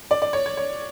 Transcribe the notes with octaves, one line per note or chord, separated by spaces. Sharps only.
D5
D5
C#5
C#5
C#5